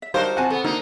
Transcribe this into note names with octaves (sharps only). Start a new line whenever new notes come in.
E5
G3 D4 D#4 F#4 A#4 C5 F5
C3 F4 F#4 F#5 G#5 A5
B3 A4
D3 A#3 D#4